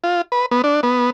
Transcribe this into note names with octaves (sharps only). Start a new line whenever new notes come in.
F4
B4
B3
D4
B3